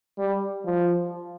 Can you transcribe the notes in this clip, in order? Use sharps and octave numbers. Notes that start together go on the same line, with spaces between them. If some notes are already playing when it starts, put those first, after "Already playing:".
G3
F3